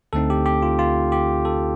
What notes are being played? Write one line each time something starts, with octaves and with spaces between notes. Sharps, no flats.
D2 D3 A3 C4 D#4 A4
G4
G4
F4
F4
G4
A4